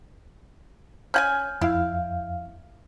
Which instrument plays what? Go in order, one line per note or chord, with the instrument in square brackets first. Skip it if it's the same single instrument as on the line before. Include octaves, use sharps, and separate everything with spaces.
[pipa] C#4 F#5 G#5 [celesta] F6 G6 G#6
[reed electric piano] F2 F5 [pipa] E4